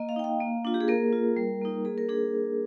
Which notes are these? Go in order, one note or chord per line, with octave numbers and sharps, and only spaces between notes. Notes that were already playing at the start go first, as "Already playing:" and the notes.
Already playing: A#3 D#5
F5
D#4 G5
F5
A#3
D4 F4
G4
G#4
A#3 A#4
F4
G3
A#3 D#4
A#3 G#4
A#4
D4 G#4